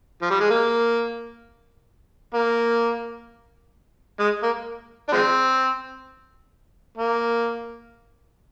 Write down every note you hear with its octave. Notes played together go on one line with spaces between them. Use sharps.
F3
G3
G#3
A#3
A#3
G#3
A#3
D4
F3 G#3 C4
A#3